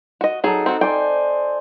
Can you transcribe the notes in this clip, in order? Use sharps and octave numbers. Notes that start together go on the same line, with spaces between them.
F#4 D#5
F#3 D#4 G#4 A4
C4 F#4
C5 D5 G5 G#5